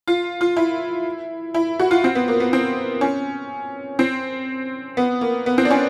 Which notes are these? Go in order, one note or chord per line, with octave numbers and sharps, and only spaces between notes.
F4
F4
E4
E4
F#4
F4
C4
B3
A#3
B3
C4
C#4
C4
B3
A#3
B3
C4
D4
C#4